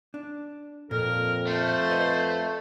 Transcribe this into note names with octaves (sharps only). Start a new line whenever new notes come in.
D4
F2 A#2 A4 A#4
A3 C5
B4 D#5